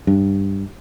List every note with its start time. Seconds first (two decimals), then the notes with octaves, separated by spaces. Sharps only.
0.07 G2